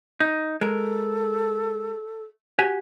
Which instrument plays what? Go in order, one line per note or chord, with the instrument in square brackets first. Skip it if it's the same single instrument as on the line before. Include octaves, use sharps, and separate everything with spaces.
[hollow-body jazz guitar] D#4
[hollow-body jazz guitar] G#3 A#4 [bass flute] A4
[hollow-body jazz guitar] F#4 G4 G#5